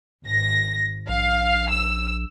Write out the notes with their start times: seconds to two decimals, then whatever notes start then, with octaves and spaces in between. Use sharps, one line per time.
0.24 G#1 A#6
1.09 A#1 F5
1.70 E6